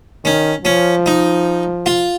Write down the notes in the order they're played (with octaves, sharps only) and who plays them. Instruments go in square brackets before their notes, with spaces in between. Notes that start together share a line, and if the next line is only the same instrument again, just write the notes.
[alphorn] D#3 [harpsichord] C#4
[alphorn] F3 [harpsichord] C#4
[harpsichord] D#4
F4